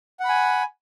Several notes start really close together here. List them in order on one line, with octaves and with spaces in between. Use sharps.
F#5 B5 G#5